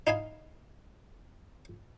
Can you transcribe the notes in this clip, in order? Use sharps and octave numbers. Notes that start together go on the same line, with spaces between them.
D#4 E4 F5 G#5